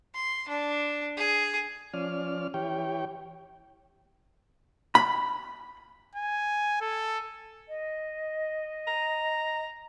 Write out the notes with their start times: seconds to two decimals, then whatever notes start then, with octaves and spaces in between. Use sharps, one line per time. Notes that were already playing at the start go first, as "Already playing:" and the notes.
0.15 C6
0.49 D4
1.17 G#4
1.94 F3 C#4 D5 F6
2.54 E3 G4 C#5 G5
4.95 B5
6.16 G#5
6.81 A4
7.68 D#5
8.88 A#5